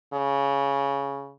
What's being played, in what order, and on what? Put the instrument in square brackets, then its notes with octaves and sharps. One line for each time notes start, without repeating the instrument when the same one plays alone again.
[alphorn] C#3